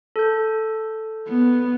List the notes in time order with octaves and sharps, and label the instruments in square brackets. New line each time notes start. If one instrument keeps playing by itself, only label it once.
[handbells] A4 G6
[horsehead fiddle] B3